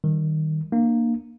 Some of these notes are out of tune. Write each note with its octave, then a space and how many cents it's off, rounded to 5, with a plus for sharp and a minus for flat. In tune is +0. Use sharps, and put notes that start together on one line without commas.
D#3 +0 G3 -20
A#3 +0 D4 +25